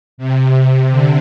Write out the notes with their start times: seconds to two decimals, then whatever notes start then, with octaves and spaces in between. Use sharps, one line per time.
0.18 C3
0.91 D3